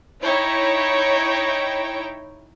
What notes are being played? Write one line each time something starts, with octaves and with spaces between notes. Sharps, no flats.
D#4 E4 C#5 G5